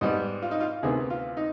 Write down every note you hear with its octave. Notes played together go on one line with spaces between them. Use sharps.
G#2 G3 B3 D#5
F4
D#4
F4
D2 C3 D#3 B3 G#4
F4
D#4